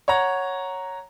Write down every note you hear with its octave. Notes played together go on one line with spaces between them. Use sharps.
C#5 F#5 A#5